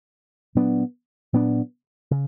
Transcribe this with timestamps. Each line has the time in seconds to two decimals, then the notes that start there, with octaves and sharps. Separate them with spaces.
0.55 A#2 F#3 B3 D4
1.33 A#2 F#3 B3 D4
2.11 C#3